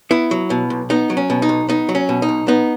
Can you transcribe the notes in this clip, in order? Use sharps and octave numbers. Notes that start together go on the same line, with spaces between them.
B3 E4
F#3
B2
B1
B3 D#4
F#3
C#4
B2
D#4
B1
B3 D#4
F#3
C#4
B2
D#4
B1
B3 D#4